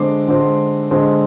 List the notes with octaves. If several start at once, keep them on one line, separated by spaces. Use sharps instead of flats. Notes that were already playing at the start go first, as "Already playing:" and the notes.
Already playing: D3 G#3 C4 C6 D6
D3 G#3 C4
D3 G#3 C4